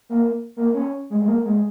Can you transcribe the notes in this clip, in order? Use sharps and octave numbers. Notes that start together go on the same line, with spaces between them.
A#3
A#3
C#4
G#3
G#3
A#3
G#3